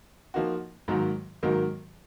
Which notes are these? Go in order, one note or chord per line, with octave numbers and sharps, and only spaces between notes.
F3 A#3 D#4 F#4
G#2 D#3 F#3 A#3
G#2 D#3 F#3 A#3